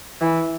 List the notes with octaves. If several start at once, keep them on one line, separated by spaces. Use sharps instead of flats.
E3